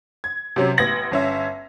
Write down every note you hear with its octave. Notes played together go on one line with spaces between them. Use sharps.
G#6
C3 F#3 C#4
A1 B3 G#6 A#6 F#7
G1 C#4 E5